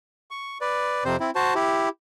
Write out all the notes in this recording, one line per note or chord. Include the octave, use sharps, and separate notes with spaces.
C#6
B4 D5
F2 C3 C4 C5
C4 E4
F#4 C5 A5
E4 G4